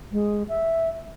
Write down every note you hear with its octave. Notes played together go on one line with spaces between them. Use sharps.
G#3
E5